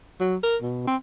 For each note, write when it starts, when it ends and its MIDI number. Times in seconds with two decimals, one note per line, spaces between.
0.20 0.36 54
0.43 0.57 70
0.62 0.85 47
0.87 0.96 60